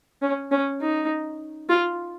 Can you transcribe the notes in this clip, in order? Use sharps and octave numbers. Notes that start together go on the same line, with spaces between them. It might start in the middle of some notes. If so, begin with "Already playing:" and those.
C#4
C#4
D#4
F4